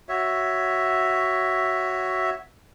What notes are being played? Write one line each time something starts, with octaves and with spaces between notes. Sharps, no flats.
F#4 C#5 E5